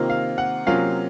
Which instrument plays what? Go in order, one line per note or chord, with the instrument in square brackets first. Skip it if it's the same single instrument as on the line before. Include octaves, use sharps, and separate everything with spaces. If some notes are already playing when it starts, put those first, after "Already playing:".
Already playing: [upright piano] C3 D#3 A#3 F4
F5
F#5
C3 F#3 A#3 C#4 F4 F5